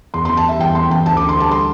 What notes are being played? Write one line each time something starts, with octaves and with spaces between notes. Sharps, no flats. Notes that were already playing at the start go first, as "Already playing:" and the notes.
E2 C6
C6
E3
A5
G3 E5
E2 G5
E2 C6
E3 G5
D2 A5
D6
D3
C6
G3 A5
C6